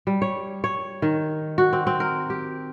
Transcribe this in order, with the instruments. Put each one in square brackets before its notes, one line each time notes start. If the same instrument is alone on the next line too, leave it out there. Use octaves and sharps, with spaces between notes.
[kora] G3
C#5
C#5
D#3
F#4
C4
C4
A#4
G4